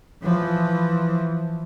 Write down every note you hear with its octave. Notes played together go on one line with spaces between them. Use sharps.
E3 F3